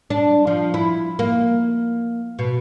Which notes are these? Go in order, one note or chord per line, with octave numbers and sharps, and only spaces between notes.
D4
F3
E4
A#3
B2